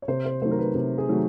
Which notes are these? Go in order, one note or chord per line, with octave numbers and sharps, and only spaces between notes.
C#5
C3 C5
C5
D#3 F#3 A3 C5
A#4
B4
C3
G#4
D#3 F#3 A3